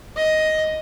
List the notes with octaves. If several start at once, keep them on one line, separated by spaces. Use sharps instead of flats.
D#5